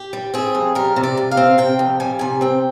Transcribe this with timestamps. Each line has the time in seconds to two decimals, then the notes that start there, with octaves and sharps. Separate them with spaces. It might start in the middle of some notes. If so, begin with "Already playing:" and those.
Already playing: G4
0.13 G3
0.34 C4 G#4
0.55 F2
0.75 G3 A#4
0.96 C3
1.03 D5
1.17 C3
1.31 F5
1.37 C4
1.58 C3 G5
1.79 F2
2.00 G3 G#5
2.19 C3 G#5
2.41 C4 G5